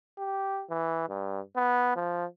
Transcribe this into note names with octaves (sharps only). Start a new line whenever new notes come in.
G4
E3
G2
B3
F3